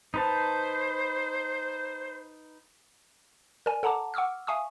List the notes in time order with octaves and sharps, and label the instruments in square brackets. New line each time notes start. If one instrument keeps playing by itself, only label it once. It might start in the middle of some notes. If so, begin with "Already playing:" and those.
[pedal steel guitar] D#4 B4 A5 [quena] C5
[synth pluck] A#4 D5 G#5
A4 F#5 A5 A#5 D6
F#5 C#6 D6 E6 F6
E5 F5 G#5 C#6 D#6